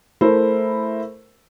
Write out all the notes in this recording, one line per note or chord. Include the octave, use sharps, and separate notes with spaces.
A3 E4 A#4 C5